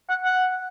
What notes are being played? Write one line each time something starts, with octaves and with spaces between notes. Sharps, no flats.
F#5
F#5